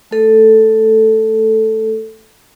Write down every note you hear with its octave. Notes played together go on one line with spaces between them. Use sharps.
A3 A4